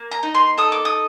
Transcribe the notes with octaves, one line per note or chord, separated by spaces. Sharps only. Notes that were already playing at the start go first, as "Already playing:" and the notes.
Already playing: A#3
A#5
D#4
C6
A4 D#6
D6
D#6